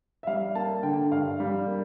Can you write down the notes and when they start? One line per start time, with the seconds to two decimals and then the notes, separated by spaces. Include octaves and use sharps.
0.23 E5
0.27 G3 F5
0.55 A#3 A5
0.83 D3 G5
1.11 G2 F5
1.40 G3
1.67 A#3